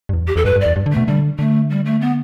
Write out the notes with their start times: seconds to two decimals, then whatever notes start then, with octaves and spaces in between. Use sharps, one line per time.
0.09 G2
0.13 E2
0.27 G4
0.36 E2 A4
0.45 G2 B4
0.56 G2
0.61 D5
0.66 E2
0.76 G2
0.86 D3
0.92 B2 A3
1.07 D3 G3
1.39 D3 A3
1.70 G3
1.85 A3
2.01 B3